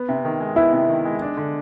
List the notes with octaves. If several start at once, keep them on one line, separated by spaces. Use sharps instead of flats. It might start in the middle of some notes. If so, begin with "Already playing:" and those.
Already playing: B3
C3
D#3
G#3
B3 E4
C3
D#3
G#3
D4
D3